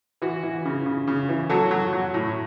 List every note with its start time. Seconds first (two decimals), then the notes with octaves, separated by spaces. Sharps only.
0.22 E3 F#4
0.43 E3
0.65 C#3
0.86 C#3
1.07 C#3
1.29 E3
1.49 F#3 F#4 A4
1.71 F#3
1.93 F#3
2.14 A2